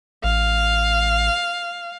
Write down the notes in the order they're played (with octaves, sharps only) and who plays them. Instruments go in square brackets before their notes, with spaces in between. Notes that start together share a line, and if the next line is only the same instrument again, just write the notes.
[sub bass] A1 [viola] F5